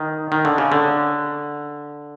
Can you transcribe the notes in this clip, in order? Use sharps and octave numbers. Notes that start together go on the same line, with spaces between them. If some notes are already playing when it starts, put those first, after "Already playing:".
Already playing: D#3
D#3
D3
C#3
D3